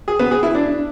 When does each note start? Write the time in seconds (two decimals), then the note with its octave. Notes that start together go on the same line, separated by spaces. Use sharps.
0.08 G#4
0.19 B3
0.31 G#4
0.43 E4
0.55 D4